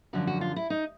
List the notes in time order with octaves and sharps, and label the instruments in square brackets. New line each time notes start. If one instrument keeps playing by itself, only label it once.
[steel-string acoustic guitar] F#2 D3 F3 F#4
F#4
F4
E4
D#4